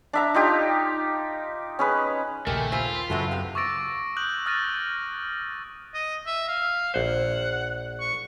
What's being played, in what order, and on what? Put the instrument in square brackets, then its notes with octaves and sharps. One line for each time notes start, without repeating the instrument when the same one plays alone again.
[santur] D4 E5 A#5
D#4 F4 G4
C#4 G#4 B4
[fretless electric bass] A#1 D#2 C#3 [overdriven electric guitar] A3 [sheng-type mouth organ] G4 G#4 [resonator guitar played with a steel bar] A#4
[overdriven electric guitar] F4 [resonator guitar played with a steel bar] C5 E5 G#5 [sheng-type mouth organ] B5
[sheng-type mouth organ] B5 C6
[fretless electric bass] F#2 C#3 [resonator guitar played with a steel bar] G#3 C4 A4 [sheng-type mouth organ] E4 F#4 B4
[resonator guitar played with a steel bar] G2 C3 G4 [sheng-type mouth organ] B3
[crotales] C#6 D6 E6 A6 A#6 D7
D6 D#6 F#6 G6 F#7
D#6 F6 F#6 A6 A#6 D#7
[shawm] D#5
E5
F5
[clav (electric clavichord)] A#1 C5 [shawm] F#5
[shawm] C#6